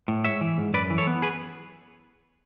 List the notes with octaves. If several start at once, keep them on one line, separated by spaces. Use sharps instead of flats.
A2
G#2 C#5 E5
E3
G#2
F#2 B4 D5
E3
A4 C#5
B3
G#4 B4